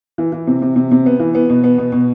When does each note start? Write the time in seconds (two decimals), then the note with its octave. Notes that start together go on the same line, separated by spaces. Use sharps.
0.18 E3
0.32 E3
0.47 C3
0.62 C3
0.76 C3
0.92 C3
1.06 B3
1.20 E3
1.35 B3
1.50 B2
1.64 B3
1.78 B2
1.92 B2